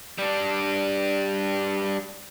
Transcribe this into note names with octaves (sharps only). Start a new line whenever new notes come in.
G3 D4